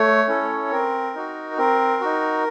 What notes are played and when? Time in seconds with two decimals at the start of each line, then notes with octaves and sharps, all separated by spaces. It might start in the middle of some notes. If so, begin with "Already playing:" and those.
Already playing: A3 C#5
0.28 C#4 E4 A4
0.71 C4 A#4
1.15 D#4 F#4
1.58 C4 A#4
2.00 D#4 F#4